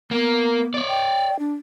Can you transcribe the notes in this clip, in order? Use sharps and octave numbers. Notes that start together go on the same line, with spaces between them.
A#3 B3
C#5 D5
G5
D4